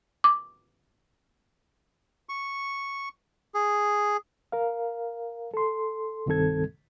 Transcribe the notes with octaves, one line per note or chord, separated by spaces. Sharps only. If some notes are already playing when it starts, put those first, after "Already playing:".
D6
C#6
G#4
A#4 F5
A4 C6
C2 G2 D#3 C4 A4 G#6